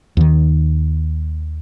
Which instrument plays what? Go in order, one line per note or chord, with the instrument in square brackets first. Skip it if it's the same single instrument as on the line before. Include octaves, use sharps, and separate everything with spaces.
[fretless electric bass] D#2 D#3